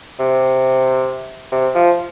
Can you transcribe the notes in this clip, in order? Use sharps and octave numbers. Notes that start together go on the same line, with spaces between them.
C3
C3
F3